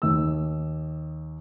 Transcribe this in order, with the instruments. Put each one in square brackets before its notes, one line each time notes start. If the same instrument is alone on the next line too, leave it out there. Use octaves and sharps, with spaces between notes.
[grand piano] D#2 E6